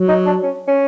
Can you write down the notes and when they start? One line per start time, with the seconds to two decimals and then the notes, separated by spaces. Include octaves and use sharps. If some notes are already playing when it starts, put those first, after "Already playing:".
Already playing: F#3
0.08 D#4
0.26 D4
0.43 C#4
0.67 C#4